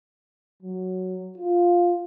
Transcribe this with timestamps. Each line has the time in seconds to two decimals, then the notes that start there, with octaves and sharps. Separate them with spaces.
0.62 F#3
1.37 F4